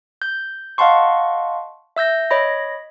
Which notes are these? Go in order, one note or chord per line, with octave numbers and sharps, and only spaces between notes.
G6
D#5 F5 F#5 A5 C6 C#6
E5 E6 G6 A#6
C#5 D#5 B5 A#6